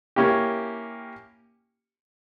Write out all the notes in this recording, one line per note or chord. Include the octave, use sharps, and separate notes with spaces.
A#3 C#4 E4 G4